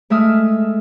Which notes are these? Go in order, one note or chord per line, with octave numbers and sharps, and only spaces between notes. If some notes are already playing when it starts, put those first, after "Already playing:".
G#3 A3 E5 D#6 F6